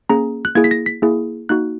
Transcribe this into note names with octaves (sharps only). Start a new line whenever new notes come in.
A#3 C#4 G#4 A#5
F#6
A#3 E4 G#4 G#6
B6
A#6
B6
A#3 E4 G#4
A#3 D#4 F#4 F#6